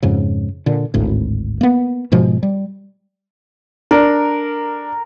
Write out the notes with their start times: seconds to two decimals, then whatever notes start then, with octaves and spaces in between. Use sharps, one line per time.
0.03 F2 G#2 C#3
0.66 A#2 D3
0.94 G#1 D2 A2
1.61 A#3 B3
2.12 G#2 B2 F3 G#3
2.43 G3
3.91 D4 A#4